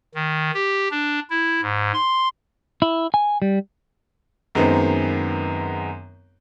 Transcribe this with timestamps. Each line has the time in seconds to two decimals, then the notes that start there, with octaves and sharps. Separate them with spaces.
0.15 D#3
0.54 G4
0.91 D4
1.30 E4
1.62 G#2
1.94 C6
2.82 E4
3.14 G#5
3.42 G3
4.55 F#2 D#3 G#3 B3 C4